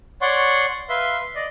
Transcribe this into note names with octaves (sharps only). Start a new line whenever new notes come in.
C#5 D5 F#5 C6 C#6
B4 E5 F5 C6
D5 D#5